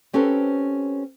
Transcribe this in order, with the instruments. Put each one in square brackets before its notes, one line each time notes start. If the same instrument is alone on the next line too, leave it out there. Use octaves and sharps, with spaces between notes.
[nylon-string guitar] C4 C#4 G4 A4 B4 C5